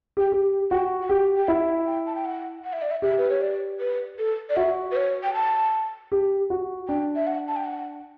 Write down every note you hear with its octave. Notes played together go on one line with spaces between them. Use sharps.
G4 G5
G4
F#4 G5
F#5
G4 G5
G5
E4 F#5
G5
A5
G5
F#5
F#5
E5
D5
E5
G4 E5
B4
C#5
D5
B4
A4
D5
F#4 E5
B4
C#5
G5
A5
G4
F#4
D4 G5
E5
F#5
A5
G5
F#5